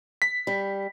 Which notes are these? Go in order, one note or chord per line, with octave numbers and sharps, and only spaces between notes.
B6
G3